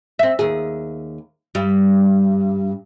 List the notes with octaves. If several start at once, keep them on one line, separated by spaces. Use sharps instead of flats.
C4 E5
D#2 G#4
G2 G3